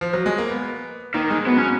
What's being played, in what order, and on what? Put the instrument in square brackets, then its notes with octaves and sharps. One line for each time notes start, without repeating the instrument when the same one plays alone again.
[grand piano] F3
F#3
G#3
A#3
B3
[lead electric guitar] D#3 [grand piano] A#3
[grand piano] G#3
[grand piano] F#3 [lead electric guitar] B3
[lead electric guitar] C#4